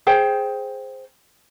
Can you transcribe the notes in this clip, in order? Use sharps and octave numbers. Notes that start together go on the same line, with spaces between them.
G#4 C5 G5